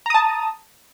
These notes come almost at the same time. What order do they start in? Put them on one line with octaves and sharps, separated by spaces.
A#5 D#6 A5